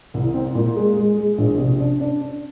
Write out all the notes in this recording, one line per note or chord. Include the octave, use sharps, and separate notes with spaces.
C2
C4
A#2
G#3
G#3
G#3
A#1
C3
D4
D4
D4